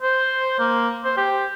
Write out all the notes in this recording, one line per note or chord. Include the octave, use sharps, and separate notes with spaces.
C5
A#3
C5
G4